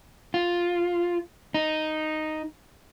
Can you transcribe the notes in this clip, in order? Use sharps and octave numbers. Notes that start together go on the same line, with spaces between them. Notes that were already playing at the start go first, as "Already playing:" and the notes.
F4
D#4